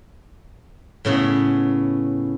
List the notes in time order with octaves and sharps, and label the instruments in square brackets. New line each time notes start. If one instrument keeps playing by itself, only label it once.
[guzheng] A2 C#3 B3